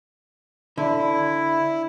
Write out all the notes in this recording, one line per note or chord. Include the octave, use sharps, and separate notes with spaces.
D3 E4